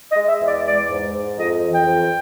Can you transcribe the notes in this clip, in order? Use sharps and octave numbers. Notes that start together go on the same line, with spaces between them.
D#5
G#3
E5
E2
D5
G#3 D5
G#2
G#2
F2 D#5
E3
G5
F2